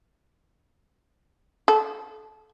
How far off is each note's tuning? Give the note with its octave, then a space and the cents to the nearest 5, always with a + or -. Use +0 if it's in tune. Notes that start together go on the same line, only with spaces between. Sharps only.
A4 -25